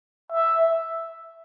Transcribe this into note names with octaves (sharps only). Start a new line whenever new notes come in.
E5